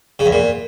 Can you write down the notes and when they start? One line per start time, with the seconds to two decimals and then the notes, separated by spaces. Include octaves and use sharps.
0.19 C#3
0.26 E2
0.32 A#2